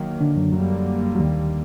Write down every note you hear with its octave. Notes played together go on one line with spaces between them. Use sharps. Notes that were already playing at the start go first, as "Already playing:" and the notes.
Already playing: D#3 F#3 A#3
D3 D4
F#2 F#3
F#2 D3 F#3 G3 A#3
F#3
D#2 D#3